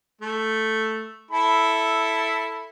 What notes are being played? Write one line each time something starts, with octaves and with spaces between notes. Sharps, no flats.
A3
E4 A4 B5